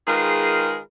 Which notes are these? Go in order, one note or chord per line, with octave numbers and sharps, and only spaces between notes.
D#3 G#3 F4 G#4 A#4 B4